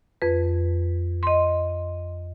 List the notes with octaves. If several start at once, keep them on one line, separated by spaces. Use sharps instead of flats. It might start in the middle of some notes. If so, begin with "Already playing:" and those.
F2 B4
D#5 C6